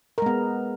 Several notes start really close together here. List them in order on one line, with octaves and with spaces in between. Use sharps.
A#4 G#3 B3